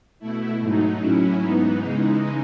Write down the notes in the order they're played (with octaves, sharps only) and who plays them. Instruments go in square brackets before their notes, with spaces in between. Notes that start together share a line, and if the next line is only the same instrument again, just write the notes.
[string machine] B2 A3 E4
G#2 F#3 A3 D#4
A2 F#3 C#4 E4
G#2 E3 B3 D#4
C#3 E3 G#3 D#4